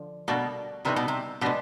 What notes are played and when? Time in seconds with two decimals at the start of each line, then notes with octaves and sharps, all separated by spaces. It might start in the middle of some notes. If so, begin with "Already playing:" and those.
Already playing: D3 F3
0.28 B2 G3 A#3 D4 F#4 A4
0.85 C3 G3 B3 D#4 F#4
0.96 B2
1.08 C3
1.41 B2 G#3 B3 D4 G4